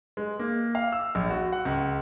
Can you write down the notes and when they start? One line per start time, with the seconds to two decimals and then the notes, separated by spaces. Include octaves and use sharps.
0.17 G#3
0.39 A#3
0.75 F5
0.93 E6
1.15 A#1
1.30 F#4
1.52 F#5
1.65 C#2